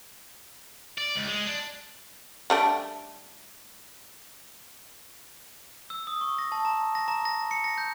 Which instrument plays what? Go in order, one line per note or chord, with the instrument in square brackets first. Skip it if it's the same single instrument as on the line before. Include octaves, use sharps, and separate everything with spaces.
[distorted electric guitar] D5
C#2
G#3
D4
[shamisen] G3 A3 D4
[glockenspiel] E6
D#6
C#6
A#6
A5
A#5
A#6
A#5
A#6
C#7
A#6
G6